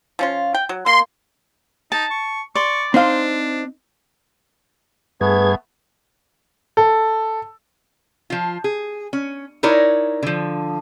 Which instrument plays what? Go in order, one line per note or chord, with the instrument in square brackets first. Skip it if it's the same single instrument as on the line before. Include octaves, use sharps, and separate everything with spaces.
[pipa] F3 C#4 F4
G5
F#3
[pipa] A#3 [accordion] C6
[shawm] D#4 [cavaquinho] A5
[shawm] C#6
[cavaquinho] D5 C6 [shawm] C#6
[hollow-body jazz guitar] C4 D#4 F5 [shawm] D4 [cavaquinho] C5 C6
[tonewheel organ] G2 G#4 G#6 [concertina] A3 B3 [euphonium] B4
[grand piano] A4
[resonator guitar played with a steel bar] F3 F4
G#4
C#4
D#4 E4 A#4 C#5 D5
D3 F3